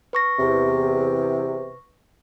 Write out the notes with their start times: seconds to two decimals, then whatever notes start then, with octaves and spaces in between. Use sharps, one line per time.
0.13 B4 C#6 A#6
0.39 E2 C3